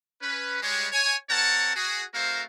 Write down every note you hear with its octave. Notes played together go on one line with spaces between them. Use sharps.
C#4 B4
G3 G#3 C#5
C#5 G#5
C4 A#4 C#5 F#5 A5
F#4 G#4
A3 C4 F#4 A#4 C5 F5